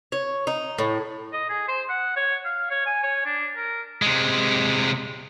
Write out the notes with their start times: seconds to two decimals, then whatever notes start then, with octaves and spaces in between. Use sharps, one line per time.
0.12 C#5
0.47 D#4
0.78 A2
1.33 D#5
1.49 G#4
1.68 C5
1.90 F#5
2.16 C#5
2.45 F5
2.70 C#5
2.86 G#5
3.03 C#5
3.25 D4
3.56 A#4
4.02 C3 G#3